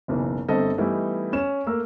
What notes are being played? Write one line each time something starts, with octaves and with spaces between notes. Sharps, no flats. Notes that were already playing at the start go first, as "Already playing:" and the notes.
F#1 B1 E3
G1 G2 C4 A4 D#5
E3 G3 A3 B3 D#4 E4
C#4 C#5 E7
A3 A#3 A#4 E6